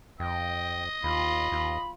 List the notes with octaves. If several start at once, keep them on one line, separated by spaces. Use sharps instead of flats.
F2 D#5 G5
D#2 F4 B5
D#2